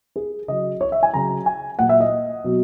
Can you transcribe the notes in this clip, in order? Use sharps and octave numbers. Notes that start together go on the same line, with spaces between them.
G#4
C#3 F#3 D#5
C#5
E5
G#5
C#3 F#3 A#5
G#5
A#2 F#3 F#5
E5
D#5
B2 F#3